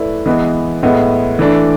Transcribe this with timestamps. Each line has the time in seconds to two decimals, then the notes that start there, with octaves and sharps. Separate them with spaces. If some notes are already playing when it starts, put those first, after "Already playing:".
Already playing: A3 E4 B4 D5
0.26 E3 G#3 B3
0.83 A2 G#3 B3
1.39 E3 A3 D4